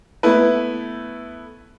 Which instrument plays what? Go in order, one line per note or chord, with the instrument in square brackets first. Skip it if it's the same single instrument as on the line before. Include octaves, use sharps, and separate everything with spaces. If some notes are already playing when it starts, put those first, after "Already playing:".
[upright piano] A3 B3 E4 B4